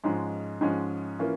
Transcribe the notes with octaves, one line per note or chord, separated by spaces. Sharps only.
G#2 F3 G#3 C#4
G#2 F3 G#3 C#4
E3 A#3 C#4 F4